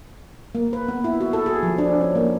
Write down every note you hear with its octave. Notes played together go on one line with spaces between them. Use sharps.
A#3
B4
B3
E4
F#4
A4
G#4
F3
D4
C#4
A#3